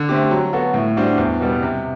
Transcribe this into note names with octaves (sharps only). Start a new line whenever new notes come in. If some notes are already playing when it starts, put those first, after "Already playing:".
Already playing: D3
A3 C4 G4
F#3
B3 F#4 A4
A2
G3 D4 F#4 C5
E2
B2 G3 B3
C3